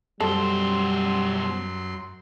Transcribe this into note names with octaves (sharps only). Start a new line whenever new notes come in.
F#2 B2 G3 A4 C5 C6